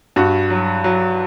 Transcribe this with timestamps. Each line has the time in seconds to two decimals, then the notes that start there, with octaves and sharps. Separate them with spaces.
0.16 G2 F#4
0.50 F#3
0.84 F#3